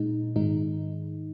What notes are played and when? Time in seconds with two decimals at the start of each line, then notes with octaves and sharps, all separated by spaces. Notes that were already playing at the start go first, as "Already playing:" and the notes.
Already playing: A#2 G#3 D#4
0.36 G#2 D#3 G#3 D#4